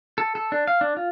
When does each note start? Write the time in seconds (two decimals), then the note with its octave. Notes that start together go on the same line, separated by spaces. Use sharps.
0.18 A4
0.35 A4
0.52 D4
0.68 F5
0.81 D4
0.97 F4